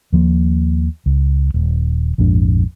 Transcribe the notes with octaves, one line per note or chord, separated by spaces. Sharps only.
D#2 F3 A#3
C#2
D#1
A#1 F2 G#2 D4